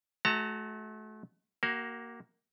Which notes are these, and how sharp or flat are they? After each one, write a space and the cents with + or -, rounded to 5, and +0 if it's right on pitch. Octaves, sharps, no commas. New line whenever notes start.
A3 -35 F#4 +0 A#5 -40
A#3 +0 F#4 +30